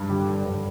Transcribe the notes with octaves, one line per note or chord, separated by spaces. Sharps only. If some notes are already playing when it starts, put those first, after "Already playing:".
Already playing: G2
D3 G4
D3
D5
G2